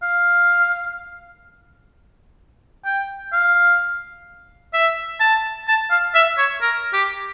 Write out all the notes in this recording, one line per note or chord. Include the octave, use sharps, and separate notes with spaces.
F5
G5
F5
E5
A5
A5
F5
E5
C#5
A#4
G4